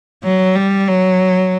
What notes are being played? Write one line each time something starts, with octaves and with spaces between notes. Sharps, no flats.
F#3
G3
F#3